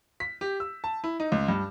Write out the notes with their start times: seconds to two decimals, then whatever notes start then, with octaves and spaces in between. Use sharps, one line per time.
0.20 B6
0.41 G4
0.60 E6
0.84 A5
1.04 E4
1.20 D#4
1.32 C#2
1.48 G2